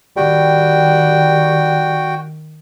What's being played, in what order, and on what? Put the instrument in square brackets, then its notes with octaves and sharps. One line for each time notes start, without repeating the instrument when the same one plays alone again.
[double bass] D#3 [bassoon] G3 [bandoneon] F#4 G5